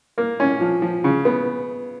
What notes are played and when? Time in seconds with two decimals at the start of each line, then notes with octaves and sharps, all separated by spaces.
0.18 A#3
0.40 C#4
0.61 F3
0.82 F3
1.04 C#3
1.25 B3